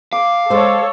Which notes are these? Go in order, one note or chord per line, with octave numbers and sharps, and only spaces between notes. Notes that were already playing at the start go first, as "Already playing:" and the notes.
F5 D6
G#3 A4 C5 C#5